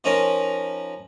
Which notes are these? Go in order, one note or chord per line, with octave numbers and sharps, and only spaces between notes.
F3 C#4 D#4 A#4